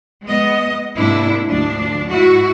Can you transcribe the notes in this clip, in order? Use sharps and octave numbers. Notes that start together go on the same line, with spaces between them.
G#3 B3 D#5
G#2 C3 A#3 D4 E4
D2 F3 D4
G#2 E4 F#4